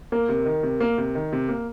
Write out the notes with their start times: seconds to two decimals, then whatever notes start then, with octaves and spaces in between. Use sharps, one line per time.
0.12 A#3 A#4
0.29 C3
0.46 D#3
0.63 C3
0.80 A#3
0.98 C3
1.15 D#3
1.32 C3
1.49 A#3